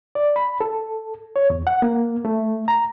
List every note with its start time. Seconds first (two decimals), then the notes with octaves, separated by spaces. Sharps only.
0.15 D5
0.36 B5
0.61 A4
1.36 C#5
1.50 E2
1.67 F#5
1.82 A#3
2.25 A3
2.68 A#5